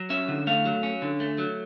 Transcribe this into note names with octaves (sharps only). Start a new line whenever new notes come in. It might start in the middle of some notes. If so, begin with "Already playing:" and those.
Already playing: F#3
C#4 E5
D3
A3 F5
F#3
C#4
D3
A3
F#3